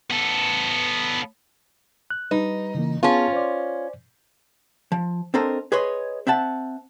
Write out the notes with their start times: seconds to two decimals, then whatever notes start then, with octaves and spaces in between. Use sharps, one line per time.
0.11 B3 A4
2.10 F#6
2.31 G3 D#4 B4
2.75 C#3 E3 A#3
3.03 B3 C#4 F4 G#4 A5
3.33 C5 D5
4.92 F3
5.34 C4 D4 A4 A#4 C5 D#5
5.72 G#4 B4 C#5 D#5 C6
6.27 C4 E5 F#5 A5